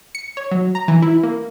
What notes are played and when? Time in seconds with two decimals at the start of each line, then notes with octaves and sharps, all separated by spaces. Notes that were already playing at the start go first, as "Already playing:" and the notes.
0.15 C#7
0.37 C#5
0.51 F#3
0.75 A#5
0.88 E3
1.02 E4
1.23 A#3